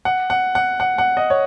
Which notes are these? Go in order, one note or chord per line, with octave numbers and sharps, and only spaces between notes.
F#5
F#5
F#5
F#5
F#5
D#5
C#5